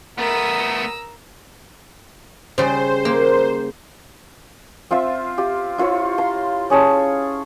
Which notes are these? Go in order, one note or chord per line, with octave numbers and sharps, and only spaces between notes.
A3 B3 A#4 A#5 D#6 E6
C#3 G3 C5
A#3
C4 F4 C5 E5
F4 G4
E4 F4 C5 C#5
A#5 C6
C#4 G#4 C#5 A5